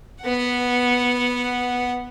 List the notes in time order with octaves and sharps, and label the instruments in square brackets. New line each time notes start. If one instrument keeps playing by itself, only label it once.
[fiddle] B3 F#5